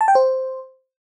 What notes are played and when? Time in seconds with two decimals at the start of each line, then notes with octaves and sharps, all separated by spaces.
0.01 A5
0.08 G5
0.15 C5